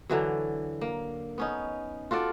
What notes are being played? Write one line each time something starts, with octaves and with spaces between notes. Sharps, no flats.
D3 E3 F#3
A#3
B3 C#4 D#4
F4 F#4 A4 D5